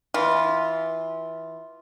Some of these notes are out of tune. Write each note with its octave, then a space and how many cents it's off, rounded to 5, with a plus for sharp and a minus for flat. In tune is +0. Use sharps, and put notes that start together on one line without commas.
E3 -20 F4 +0